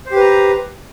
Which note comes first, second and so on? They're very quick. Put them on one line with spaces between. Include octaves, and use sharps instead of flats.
C5 G4 B4 A#5